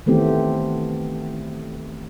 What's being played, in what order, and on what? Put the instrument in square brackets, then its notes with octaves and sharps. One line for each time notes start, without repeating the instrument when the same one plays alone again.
[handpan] D#3 E3 A3 B3 C4 G4